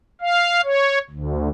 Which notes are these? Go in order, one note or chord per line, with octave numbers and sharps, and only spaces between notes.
F5
C#5
D2